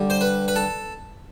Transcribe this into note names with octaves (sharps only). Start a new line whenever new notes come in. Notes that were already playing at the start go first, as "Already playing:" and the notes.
Already playing: D3 G3
C5
B4
B4
A4